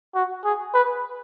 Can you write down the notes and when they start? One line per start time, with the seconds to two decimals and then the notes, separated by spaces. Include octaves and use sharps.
0.15 F#4
0.44 G#4
0.74 B4